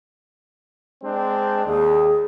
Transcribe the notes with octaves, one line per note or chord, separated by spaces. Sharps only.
G#3 C4 D4
D#2 G#4